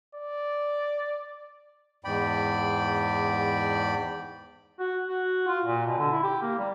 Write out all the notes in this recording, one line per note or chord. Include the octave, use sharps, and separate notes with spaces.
D5
E2 G#2 D5 G5 B5
F#4
F#4
F4
A#2
B2
D3
E4
G4
A#3
G3